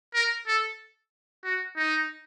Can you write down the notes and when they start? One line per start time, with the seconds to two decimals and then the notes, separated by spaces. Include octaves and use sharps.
0.14 A#4
0.47 A4
1.44 F#4
1.77 D#4